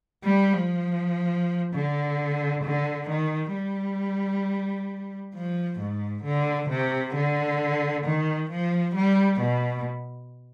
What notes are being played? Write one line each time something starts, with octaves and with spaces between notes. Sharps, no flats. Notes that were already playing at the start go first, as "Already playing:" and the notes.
G3
F3
D3
D3
D#3
G3
F3
G#2
D3
C3
D3
D#3
F3
G3
B2